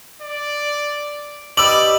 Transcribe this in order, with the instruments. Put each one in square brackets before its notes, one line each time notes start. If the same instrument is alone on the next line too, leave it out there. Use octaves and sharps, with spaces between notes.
[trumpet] D5
[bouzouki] G4 B4 D#5 [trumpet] D5 [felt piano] D6 E6 [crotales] F#7